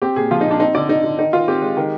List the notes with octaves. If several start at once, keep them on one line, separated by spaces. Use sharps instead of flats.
C4 G4
A#2 G#4
F3 F4
D#4
A#2
D4
C4 D#4
D3 D5
D3 D#4
D3
D#3 D#4
D#3 F4
C4 G4
G#3
D#3